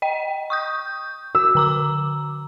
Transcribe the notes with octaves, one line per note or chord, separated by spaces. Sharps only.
D#5 G5
C#6 D#6 G6
F#4 E6
D3 A#5 D6